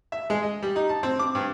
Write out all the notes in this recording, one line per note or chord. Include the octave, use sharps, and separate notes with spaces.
E5
G#3
D#5
G3
D#4
A5
C4
D6
G2